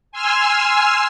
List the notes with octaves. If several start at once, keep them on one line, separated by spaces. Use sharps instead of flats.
G#5 C6 E6 F6